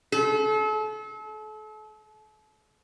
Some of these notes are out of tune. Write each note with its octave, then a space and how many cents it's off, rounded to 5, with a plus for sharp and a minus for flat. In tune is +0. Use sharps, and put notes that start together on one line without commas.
A4 -40